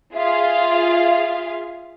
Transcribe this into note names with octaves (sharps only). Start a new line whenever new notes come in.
F4 G#4 E5 F5